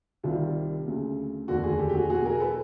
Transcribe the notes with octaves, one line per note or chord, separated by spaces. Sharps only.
C2 C3 D#3 G3 F4
D2 C#3 F#3
F1 D#2 D3 F#4
F#4 G#4
G4 A4
G4
F#4 G#4
E2 B2 F#3 F#4 G#4
G#4 A#4
A4 B4